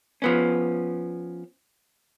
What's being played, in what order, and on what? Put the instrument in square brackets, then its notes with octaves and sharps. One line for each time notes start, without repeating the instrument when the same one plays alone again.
[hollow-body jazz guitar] F3 B3 C#4